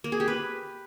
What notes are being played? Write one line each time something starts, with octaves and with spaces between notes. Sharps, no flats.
A#3
G#4
G4
B4